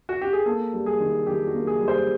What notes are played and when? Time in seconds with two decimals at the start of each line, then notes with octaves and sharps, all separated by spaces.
0.09 F#4
0.21 G4
0.33 G#4
0.46 A#3 A4
0.73 G3
0.86 G#4
1.00 D#3
1.27 D#3 G4
1.47 F#4
1.54 A#3
1.67 G#4
1.81 G3
1.88 C5